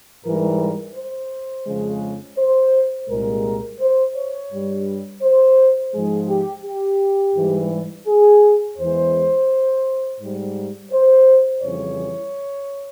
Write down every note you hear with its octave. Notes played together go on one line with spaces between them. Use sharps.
G#2 E3 G3 A#4
C5
F2 C#3 F3 G#3
C5
C2 A#2 G#3 A#4
C5
C#5
G2 G3
C5
G#2 F3 G#3 G#4
G4
G4
G#2 E3 G3
G#4
E2 E3 G#3 C5
G#2 G3
C5
F2 C#3 E3 G3 C#5